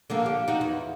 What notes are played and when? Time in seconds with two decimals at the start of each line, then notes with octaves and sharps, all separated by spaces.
0.10 D3 F3 A#3
0.26 G4
0.48 D#4 F#4
0.61 E2